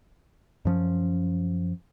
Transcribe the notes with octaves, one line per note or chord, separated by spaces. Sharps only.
F#2 F3 C#4